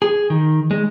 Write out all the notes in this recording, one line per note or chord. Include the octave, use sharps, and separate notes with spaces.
G#4
D#3
G#3